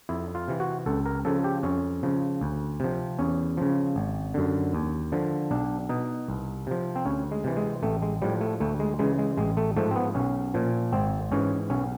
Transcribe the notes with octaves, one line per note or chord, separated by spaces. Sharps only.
F2 E4
F4
C3 E3
F#4
C#2 A4
A#4
C#3 F3 A4
G4
F2 C#4
C#3 F3
D2
C3 F3
E2 C#4
C#3 F3
G#1
F#2 D3
D#2
D3 F3
B1 D4
B2 D#4
C2
C3 F3
C4
D2 C#4
G#3
C3 E3
G#3
A1 A3
G#3
A2 F3 G3
A3
D2 A3
G#3
C#3 E3 G#3
G#3
A1 G#3
A3
G#2 F3 A3
C4
B3
B1 C#4
A#2 F3
G#1 C4
G#2 E3 C#4
B1 C#4